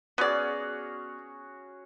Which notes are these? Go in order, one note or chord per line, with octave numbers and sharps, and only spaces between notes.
B3 C#4 F#4 G#4 D5